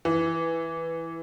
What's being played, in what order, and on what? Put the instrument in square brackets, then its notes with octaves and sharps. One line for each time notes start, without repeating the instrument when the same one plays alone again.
[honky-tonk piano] E3